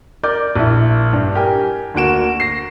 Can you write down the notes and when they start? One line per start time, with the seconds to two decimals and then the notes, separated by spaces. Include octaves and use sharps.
0.23 A#4 D5 D6 G6
0.56 A#1 E4
1.13 G2
1.35 G4 A#4 G#5
1.94 D2 D3 A#3 F#4 D7 E7
2.40 A#6 C7